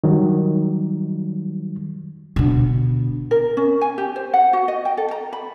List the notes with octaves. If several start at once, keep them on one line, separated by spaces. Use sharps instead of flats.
D#3 F#3 G3
B2 D3
A#4
C#4
G#5
G4
C5
F#5
F#4
D#5
G5
A4
A#5
B5